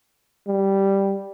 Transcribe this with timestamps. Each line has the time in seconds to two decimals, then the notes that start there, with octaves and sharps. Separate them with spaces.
0.47 G3